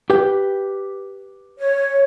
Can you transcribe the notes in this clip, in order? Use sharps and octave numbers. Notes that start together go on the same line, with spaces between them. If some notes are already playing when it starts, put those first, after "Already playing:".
G4 B4 G5
C#5